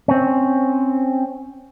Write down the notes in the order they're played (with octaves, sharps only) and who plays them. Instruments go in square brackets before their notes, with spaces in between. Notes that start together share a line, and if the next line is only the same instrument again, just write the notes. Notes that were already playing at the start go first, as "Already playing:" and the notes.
[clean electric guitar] C4 C#4